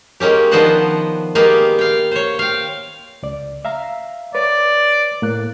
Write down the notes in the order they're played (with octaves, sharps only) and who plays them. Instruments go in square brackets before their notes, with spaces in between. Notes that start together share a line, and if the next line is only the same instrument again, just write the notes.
[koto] G#3 A#3 C#4 G4
D#3 F3 B3 D4 C5 F#5
G#3 A#3 B3 G4 F5
F5 G5
C5 C#5
F5 G5
[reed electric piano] C#2 D5
E5 F5 A#5
[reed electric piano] B4 C#5 [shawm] D5
[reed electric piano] A2 A#3 F#6